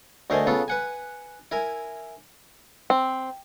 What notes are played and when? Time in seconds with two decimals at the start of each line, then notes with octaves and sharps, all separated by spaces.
0.30 D2 A3 A#4 C5 D#5 G#5
0.47 C#3 B3 F4 A4
0.68 B4 F#5 G#5
1.51 E4 A#4 G#5
2.90 C4